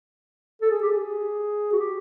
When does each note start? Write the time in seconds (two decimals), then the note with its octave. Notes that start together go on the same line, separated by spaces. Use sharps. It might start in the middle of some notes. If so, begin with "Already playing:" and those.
0.62 A4
0.71 G#4
0.82 G4
0.92 G#4
1.72 F#4
1.79 G4